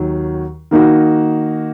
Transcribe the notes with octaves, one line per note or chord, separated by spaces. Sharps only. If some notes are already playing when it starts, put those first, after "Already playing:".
Already playing: D#2 D#3 F#3
D#3 A#3 D#4 F#4